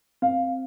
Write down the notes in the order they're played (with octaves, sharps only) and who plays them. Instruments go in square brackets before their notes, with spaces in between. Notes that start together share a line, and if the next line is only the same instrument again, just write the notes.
[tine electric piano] C4 [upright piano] F5